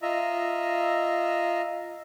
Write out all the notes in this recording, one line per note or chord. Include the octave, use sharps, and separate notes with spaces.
F4 D#5 E5 A#5